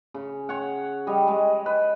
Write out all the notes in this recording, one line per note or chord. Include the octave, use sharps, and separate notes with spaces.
C#3
C#5 F#5
G3 D#5
G#3
B4